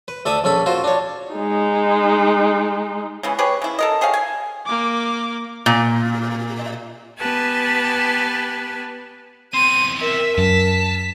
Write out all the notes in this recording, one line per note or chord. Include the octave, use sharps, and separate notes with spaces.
B4
D2 A4 D5 E5 D#6
A#1 C#4 A4 B5
F4 F#4 C5
D4 C#5
G#3 D#4
C#3 E3 B3
G4 G#4 B4 C#5
C#3 E4
A4 A#4 D#5
G4 G#4 C#5 F5
G#5
A#3 D6
A#2
B3 G4 B4 G#5 A5
E2 C4 C6 D#7
A#4 E5
F#2 A5 B6